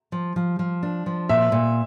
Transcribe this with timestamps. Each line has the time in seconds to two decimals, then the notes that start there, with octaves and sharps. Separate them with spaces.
0.12 F3
0.36 F3
0.59 F3
0.83 D4
1.06 F3
1.29 A#2 E5
1.52 A#2